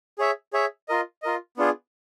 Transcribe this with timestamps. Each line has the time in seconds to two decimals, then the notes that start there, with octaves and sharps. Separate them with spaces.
0.19 G#4 C#5 E5
0.53 G#4 C#5 E5
0.89 F4 A#4 D#5
1.23 F4 A#4 D#5
1.57 B3 D4 F4 G#4